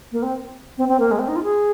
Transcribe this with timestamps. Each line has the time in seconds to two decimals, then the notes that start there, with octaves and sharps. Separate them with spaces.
0.12 A#3
0.23 C4
0.78 C4
0.89 C4
1.00 A#3
1.11 G#3
1.19 C4
1.28 D#4
1.36 F4
1.43 G#4